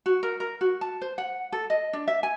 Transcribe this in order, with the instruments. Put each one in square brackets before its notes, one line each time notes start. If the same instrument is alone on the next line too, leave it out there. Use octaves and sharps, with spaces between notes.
[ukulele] F#4
A#4
A#4
F#4
A5
C5
F#5
A4
D#5
D4
E5
G#5